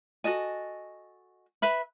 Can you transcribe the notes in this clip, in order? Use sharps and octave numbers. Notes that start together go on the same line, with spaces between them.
F#4 A4 D#5 G#5
B4 E5 B5